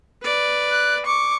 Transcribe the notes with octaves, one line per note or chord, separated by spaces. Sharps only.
B4 D5
F#6
C#6 D6